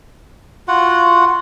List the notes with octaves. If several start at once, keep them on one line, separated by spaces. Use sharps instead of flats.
F4 F#4 F#5